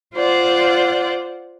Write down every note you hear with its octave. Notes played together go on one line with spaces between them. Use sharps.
F4 C5 D5 F#5